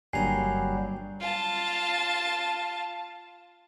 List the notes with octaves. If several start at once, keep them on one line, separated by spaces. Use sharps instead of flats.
G1 G2 A#2 F#3 G3 G#5 A#5 C7
F4 A5